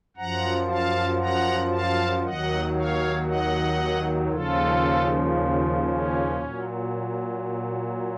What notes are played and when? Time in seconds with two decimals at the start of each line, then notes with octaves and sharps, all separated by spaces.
0.17 F#2 F3 F#5 A#5
0.69 F5 A5
1.20 F#5 A#5
1.72 F5 A5
2.24 D#2 D#3 F#3 D#5 F#5
2.75 C#5 F5
3.27 D#5 F#5
4.30 D#2 C#3 F3 F4 A4
5.86 C#4
6.37 A#2 F#3